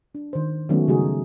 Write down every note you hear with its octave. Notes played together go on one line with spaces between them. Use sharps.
D4
D#3 C5
D#3 F#3 G#3 A3 B3 C#4
C#3 G3 A3 D#4 F#4 G#4